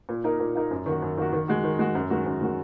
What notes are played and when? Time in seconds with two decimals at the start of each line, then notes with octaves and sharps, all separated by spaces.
0.09 A#2
0.24 A#3 D#4 A#4
0.40 A#2
0.55 A#3 D#4 A#4
0.71 F#2
0.86 D#3 A#3 F#4
1.02 F#2
1.17 D#3 A#3 F#4
1.33 D#3
1.48 G#3 F#4
1.64 D#3
1.79 G#3 F#4
1.95 F#2
2.10 D#3 G#3 F#4
2.26 F#2
2.41 D#3 G#3 F#4